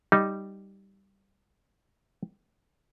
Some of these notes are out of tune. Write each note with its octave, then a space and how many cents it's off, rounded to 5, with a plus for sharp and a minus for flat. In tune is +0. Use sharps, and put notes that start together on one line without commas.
G3 +0 D#4 +0